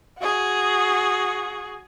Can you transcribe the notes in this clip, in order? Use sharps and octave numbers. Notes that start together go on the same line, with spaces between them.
F#4 G#4